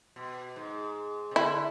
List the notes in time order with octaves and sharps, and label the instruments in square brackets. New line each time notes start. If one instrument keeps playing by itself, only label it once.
[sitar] B2
G#2
C3
[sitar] D3 [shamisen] E4